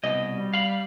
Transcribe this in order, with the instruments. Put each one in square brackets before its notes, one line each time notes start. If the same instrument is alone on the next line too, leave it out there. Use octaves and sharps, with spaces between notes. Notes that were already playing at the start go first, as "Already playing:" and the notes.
[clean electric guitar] C2 B2 [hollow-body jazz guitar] D#5
[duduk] G3
[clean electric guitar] F5 B5